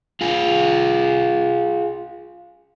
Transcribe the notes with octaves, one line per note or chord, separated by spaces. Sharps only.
F4 G#4